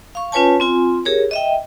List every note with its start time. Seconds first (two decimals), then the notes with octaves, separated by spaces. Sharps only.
0.15 F5 C#6
0.32 C#4 F4 B4 C#5 G#5 A5
0.60 C4 F4 G#5
1.05 G4 G#4 A#4 C#5
1.31 D#5 E5 G5